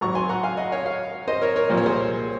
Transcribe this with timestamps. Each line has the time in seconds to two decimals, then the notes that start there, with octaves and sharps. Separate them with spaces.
0.01 G#1 G#2 F#3 A#5 C#6
0.15 G#5 C6
0.29 F#5 A#5
0.43 F5 G#5
0.57 D#5 F#5
0.72 C#5 F5
0.86 C#5 F5
1.28 C5 D#5
1.42 A#4 C#5
1.56 A#4 C#5
1.69 C2 A#2 F3 A#3 C5
1.77 C#5
1.86 G#4 C5